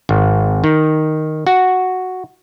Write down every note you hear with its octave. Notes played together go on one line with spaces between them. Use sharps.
G#1
D#3
F#4